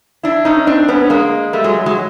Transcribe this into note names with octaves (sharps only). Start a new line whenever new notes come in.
D4 E4
C#4 D#4
C4 D4
B3 C#4
G#3 A#3
G3 A3
F#3 G#3
F#3 G#3